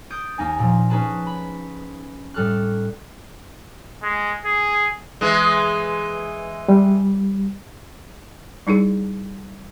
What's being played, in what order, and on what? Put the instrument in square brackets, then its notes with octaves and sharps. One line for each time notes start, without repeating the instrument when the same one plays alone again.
[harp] D#6 G6 A6 D7
D#2 A#3 D#4 G#5
A#2 F3
C#4 D#4 G#4 B4 A5
B5
A2 G3 A4 F6 F#6
[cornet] G#3
G#4
[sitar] E3 G#3
[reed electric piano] G3
[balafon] G3 D#4 E4 G#4